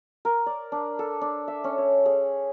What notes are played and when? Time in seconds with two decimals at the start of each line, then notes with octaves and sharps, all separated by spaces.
0.25 A#4
0.46 D5
0.72 D4
0.99 A4
1.21 D4
1.48 E5
1.64 C#4
1.78 C#5
2.06 G#4